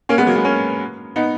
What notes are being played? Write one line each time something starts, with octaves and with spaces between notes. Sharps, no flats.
A#3 C#4
G#3 B3
F#3 A#3
G#3 B3
A#3 C#4
B3 D#4